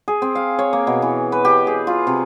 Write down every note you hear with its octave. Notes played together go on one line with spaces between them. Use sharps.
G#4
C4
F5
C#5
A#3
B2
E3
B4
G4
G#4
F4
C3